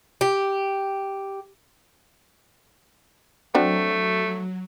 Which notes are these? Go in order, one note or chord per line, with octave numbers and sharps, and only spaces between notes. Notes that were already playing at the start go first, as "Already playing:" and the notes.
G4
F#3 A3 C4 D4 F#4